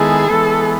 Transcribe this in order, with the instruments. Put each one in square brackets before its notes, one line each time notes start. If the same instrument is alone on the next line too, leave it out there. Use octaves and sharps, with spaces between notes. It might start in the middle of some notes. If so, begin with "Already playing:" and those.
Already playing: [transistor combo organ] D#3 G#3 B3 E4 A4 [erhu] G#4
[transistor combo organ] E3 G#3 B3 [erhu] A4